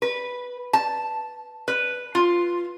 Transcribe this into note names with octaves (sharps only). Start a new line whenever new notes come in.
B4
A5
B4
F4